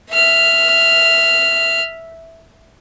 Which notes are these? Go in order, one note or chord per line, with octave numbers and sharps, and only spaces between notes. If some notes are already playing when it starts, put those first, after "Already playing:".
E5 F6